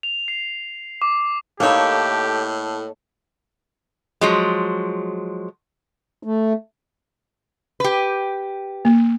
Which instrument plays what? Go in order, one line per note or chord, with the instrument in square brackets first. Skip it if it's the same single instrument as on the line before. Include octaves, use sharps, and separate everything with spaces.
[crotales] F7
C7
D6
[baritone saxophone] A2 [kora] A#3 D#4 E4 [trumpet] G4 [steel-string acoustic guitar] A4 C#5
[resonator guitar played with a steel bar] F3 F#3 G#3
[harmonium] A3
[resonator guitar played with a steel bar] G4 B4
[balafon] A#3